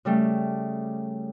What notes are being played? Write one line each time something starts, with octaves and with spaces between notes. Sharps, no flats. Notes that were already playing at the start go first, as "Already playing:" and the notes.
C#3 G3 A3